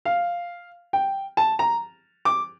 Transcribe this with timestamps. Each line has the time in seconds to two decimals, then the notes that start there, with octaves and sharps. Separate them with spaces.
0.05 F5
0.93 G5
1.37 A5
1.59 A#5
2.25 D6